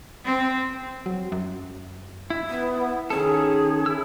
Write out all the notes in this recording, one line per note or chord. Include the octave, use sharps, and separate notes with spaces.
C4
F#3
F#2
E4
B3
D#3 C#4 G#4 A4
E4 E6